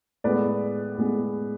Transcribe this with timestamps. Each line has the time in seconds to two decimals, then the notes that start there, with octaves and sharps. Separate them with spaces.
0.24 A2 G#3 B3 B4 D5
0.97 A2 G#3 B3